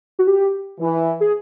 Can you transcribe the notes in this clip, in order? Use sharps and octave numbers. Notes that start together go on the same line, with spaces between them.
F#4
G4
E3
G#4